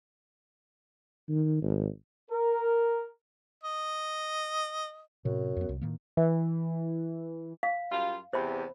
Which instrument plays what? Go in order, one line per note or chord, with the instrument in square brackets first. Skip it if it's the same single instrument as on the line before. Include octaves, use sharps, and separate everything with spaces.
[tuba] D#3
G#1
[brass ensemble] A#4
[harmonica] D#5
[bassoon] F#2 [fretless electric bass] A2 C3
[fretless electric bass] F2 B3
C2
A2 D#3 A#3
[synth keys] E3
[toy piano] F5
[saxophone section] F#2 G3 F4
[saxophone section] E2 C3 [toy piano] C5 B5